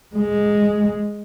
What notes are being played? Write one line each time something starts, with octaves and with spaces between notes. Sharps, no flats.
G#3